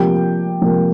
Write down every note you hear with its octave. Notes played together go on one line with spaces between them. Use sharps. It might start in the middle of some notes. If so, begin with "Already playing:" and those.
Already playing: C3 F3 A#3 G4 G5
C3 F3 A#3